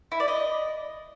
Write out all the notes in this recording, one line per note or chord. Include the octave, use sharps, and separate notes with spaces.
E4
D5
D#5